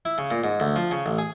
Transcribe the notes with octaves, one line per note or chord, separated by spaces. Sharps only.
E4
C#3
A#2
G#2
D2
F3
C#3
A1
G#4